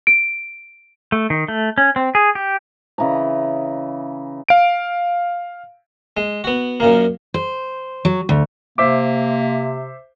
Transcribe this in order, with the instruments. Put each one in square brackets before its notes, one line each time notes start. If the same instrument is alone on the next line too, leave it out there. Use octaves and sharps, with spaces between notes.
[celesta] D7
[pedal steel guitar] A3
D#3
A3
C#4
C4
G#4
G4
[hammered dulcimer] C#3 E3 D#5 A#5
[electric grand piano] F5 D7
[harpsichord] G#3
B3 F#4
F#2 A#2 A#3
[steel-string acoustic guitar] C5
F#3
D2
[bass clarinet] C3 [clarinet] A#3 [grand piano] C5 E5 D6